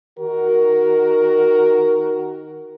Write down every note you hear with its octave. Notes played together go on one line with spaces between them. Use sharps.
D#3 F#4 A#4